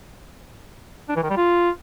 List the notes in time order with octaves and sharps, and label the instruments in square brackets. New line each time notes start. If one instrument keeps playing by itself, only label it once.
[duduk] D4
E3
D#3
G3
F4